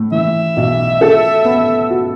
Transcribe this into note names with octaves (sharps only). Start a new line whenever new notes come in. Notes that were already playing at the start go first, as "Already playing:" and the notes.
Already playing: A2 A3
E3 E5
B1
A4
B3
F#4